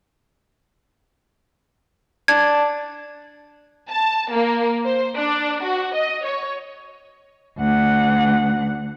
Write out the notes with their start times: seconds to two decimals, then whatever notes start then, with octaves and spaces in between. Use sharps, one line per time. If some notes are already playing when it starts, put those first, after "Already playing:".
2.28 D4 G#6
3.90 A5
4.33 A#3
4.85 C5
5.15 D4
5.63 F#4
5.95 D#5
6.24 C#5
7.58 D2 F#5